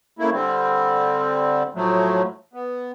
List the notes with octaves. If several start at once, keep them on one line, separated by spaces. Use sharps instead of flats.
C#3 A3 A#3 E4
D3 G3 C4
A2 F3 F#3 A3
B3